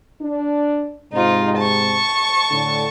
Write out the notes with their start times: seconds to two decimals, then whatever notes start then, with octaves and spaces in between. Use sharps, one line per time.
0.22 D4
1.13 G#2 C3 D#4 F4
1.58 A5 C#6
2.51 A2 D3